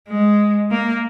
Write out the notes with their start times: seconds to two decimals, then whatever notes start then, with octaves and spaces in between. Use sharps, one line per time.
0.08 G#3
0.71 A#3